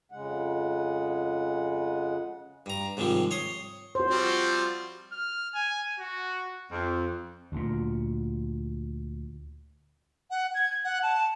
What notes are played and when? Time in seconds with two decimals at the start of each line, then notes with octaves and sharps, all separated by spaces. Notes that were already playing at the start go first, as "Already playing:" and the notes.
0.12 F2 C#3 G#3 F#5
2.66 G2 A#5
2.97 G#2 C3 D#3 F3 G3
3.31 C#5 C6 D#6
3.95 F#4 C5
4.11 F3 G3 C4
5.12 F6
5.55 G#5
6.00 F#4
6.71 F2
7.52 D2 A#2
10.30 F#5
10.54 G#6
10.84 F#5
11.03 A5